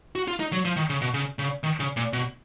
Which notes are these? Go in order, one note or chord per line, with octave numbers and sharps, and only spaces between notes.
F#4
F4
D#4
F#3
F3
D#3
C#3
B2
C#3
C#3
D#3
C#3
A#2
B2